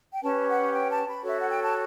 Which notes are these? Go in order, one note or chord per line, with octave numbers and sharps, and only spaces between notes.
G5
C#4 G4 B4 A5
F#5
G5
A5
B5
F#4 A4 C#5 E5
F#5
G5
A5